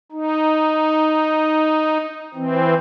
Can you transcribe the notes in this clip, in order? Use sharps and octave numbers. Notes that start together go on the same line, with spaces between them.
D#4
E3 C4